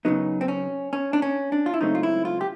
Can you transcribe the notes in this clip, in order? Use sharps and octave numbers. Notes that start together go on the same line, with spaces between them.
F#2 C#3 F#3 B3 D#4
C4
C#4
C#4
D4
C#4
D4
F4
E4
C#2 C#3 F#3 A3 C4 D#4
F4
E4
F4
G4